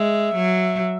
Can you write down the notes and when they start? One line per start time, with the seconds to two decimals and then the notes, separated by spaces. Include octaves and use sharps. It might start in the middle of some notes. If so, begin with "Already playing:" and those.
Already playing: G#3 E5
0.35 F#3